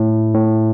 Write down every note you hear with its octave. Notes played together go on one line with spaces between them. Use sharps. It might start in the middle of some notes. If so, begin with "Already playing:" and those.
Already playing: A2
A2